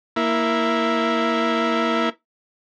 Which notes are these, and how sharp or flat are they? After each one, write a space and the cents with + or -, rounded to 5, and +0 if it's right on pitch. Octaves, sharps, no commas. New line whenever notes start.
A#3 +0 E4 +0